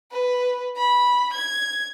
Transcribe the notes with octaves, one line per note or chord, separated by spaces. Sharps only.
B4
B5
G#6